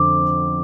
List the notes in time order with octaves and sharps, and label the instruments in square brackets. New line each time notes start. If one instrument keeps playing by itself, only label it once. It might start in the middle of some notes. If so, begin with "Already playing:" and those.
Already playing: [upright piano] F2 D3 C4 [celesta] D6